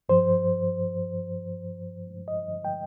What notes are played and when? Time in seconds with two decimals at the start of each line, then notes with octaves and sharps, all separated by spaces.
0.09 G2 F3 C5
2.28 D#5
2.65 G5